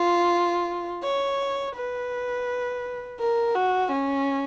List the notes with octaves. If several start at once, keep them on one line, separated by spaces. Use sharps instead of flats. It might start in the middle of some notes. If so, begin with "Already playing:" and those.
Already playing: F4
C#5
B4
A#4
F#4
C#4